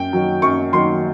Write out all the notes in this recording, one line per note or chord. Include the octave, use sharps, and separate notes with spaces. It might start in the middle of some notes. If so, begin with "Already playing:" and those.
Already playing: F#2 G5
D#3 F#3
F#2 C#6
D#3 F#3 C6